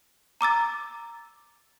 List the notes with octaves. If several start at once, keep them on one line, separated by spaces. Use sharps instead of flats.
A#5 D6 E6 A6